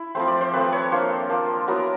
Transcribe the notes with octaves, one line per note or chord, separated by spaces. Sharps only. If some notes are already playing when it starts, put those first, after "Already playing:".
Already playing: E4
F3 A3 C4 C5
D5
C5
F3 A3 C4 B4
C#5
A#3 D4 F4 C5
A#3 D4 F4
F#3 B3 E4 A#4